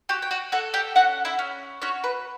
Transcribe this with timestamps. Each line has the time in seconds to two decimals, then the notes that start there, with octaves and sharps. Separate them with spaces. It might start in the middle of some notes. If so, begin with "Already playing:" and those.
0.09 F#4 G4 G5
0.22 G5
0.31 F#4 F#5
0.52 F#4 A4 F#5
0.74 G4 G5
0.96 C#4 F#4 F#5
1.25 E4 E5
1.39 C#4
1.82 C#4 F#4 C#5
2.04 B4